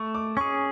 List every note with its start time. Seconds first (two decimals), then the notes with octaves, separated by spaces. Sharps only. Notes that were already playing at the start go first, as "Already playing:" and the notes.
Already playing: A3 C#6
0.14 D6
0.37 C#4 G#4 C#6